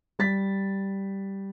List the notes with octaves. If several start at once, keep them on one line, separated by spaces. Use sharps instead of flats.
G3 A6 B6